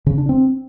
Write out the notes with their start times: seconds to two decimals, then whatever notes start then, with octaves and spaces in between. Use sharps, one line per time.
0.06 C#3
0.18 D4
0.29 C4